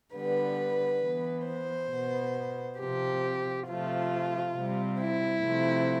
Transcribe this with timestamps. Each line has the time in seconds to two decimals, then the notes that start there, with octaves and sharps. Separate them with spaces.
0.15 D3 G3 B3 B4
1.03 E3 B3
1.47 C5
1.92 B2 B3
2.80 C3 F3 C4 G4
3.68 C3 F3 A3 F4
4.56 C3 G3 C4
5.00 E4
5.44 C3 F3 A3 C4